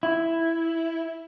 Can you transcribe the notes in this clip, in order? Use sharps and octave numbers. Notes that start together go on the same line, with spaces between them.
E4